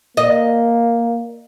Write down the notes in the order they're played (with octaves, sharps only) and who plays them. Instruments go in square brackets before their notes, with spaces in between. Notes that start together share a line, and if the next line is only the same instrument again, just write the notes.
[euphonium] A#3 [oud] D#5